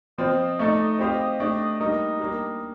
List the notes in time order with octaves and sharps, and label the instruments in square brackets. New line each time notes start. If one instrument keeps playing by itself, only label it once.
[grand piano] F3 C4 F4 C5 [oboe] D#5
[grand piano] A3 D#4 A4 D5
C4 G4 C5 F5
A3 D4 G4
[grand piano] G3 A#3 D#4 [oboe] D#5
[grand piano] G3 A#3 D4